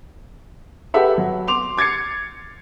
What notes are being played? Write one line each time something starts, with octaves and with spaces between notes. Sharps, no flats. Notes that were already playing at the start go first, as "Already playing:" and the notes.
G4 A4 B4 E5 F#5
F#3
C6 D6 F7
D6 G#6 A6 C7 C#7